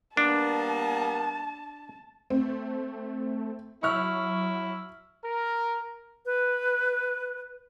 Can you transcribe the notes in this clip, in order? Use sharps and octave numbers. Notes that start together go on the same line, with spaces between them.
G3 A#3 B3 D4 A5
A3 C4
F#3 E4 C#6 F6
A#4
B4